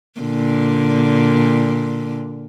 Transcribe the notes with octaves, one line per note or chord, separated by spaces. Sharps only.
A#2 D3